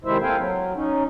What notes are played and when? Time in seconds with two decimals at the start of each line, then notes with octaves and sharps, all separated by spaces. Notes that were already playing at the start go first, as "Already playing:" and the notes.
0.05 C3 D#3 G#3 E4 C5 E5
0.22 A#3 C4 A4 F5 G5 G#5
0.37 F#3
0.75 C#4 D#4